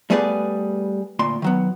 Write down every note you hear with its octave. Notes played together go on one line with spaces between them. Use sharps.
G3 A3 B3 G#4 B4 D5
D2 A#2 C6
D#3 F#3 B3